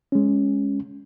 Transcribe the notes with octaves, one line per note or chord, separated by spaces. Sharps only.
G#3 C#4